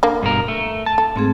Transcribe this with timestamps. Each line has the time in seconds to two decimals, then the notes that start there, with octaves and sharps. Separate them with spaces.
0.03 D3 A#3
0.23 G2 B2 A#4
0.48 A3
0.86 A5
0.98 A4
1.16 G#2 A3 C4 G#4